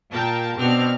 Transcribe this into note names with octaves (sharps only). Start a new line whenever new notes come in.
A#2 A#4 G5 A5
B2 C4 D4 F6